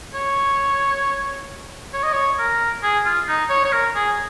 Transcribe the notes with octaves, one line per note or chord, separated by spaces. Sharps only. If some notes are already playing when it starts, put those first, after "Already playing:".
C#5
C#5
D#5
C#5
A#4
G#4
F4
D#4
C#5
C#5
A#4
G#4